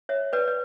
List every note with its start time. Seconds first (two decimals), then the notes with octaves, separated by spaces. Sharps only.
0.09 C#5 E5
0.33 B4 D5
0.48 D5